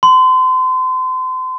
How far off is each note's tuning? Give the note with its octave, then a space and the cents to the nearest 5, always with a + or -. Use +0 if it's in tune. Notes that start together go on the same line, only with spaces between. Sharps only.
C6 -35